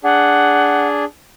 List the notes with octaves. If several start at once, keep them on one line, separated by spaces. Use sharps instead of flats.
D4 G#4 F#5